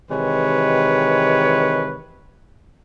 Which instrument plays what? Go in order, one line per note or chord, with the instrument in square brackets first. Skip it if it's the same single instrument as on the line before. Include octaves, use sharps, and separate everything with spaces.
[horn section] C3 D#3 E3 G#3 B4 C#5